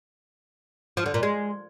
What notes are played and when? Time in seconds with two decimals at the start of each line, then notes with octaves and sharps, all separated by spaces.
0.97 F3
1.06 D3
1.14 A#2
1.23 G#3